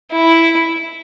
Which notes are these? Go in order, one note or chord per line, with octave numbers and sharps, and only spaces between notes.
E4